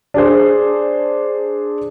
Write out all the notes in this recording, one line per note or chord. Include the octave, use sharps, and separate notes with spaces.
D4 G#4 C5